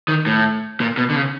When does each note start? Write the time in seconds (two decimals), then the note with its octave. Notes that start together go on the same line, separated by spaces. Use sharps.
0.08 D#3
0.26 A2
0.80 A#2
0.97 B2
1.10 D3
1.16 C#3